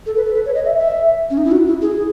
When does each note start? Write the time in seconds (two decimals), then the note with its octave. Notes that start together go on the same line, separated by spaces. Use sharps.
0.06 A4
0.17 B4
0.26 A4
0.35 B4
0.46 C#5
0.55 D#5
0.65 E5
0.79 E5
1.30 C#4
1.37 D#4
1.45 E4
1.52 F#4
1.67 E4
1.82 G#4